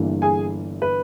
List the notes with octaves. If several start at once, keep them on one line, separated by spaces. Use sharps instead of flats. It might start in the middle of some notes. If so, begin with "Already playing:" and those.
Already playing: G1 G2 E3 A#3
G#4 G#5
B4